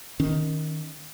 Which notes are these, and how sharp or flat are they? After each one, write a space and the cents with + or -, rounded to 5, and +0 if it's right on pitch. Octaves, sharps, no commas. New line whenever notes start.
D#3 +0 C#4 +0